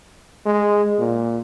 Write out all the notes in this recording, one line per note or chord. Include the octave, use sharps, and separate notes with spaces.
G#3
A#2